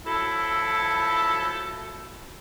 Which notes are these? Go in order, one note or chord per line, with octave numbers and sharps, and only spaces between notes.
F3 F#3 E4 A4